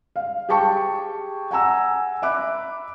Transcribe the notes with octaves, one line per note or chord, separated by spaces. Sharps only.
F5
G4 G#4 G5 A5 C#6
F#5 G#5 A#5 E6
E5 B5 D6 F#6